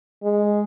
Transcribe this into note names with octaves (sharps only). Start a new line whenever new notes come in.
G#3